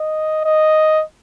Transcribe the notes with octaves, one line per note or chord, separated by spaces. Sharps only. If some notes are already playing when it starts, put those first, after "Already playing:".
Already playing: D#5
D#5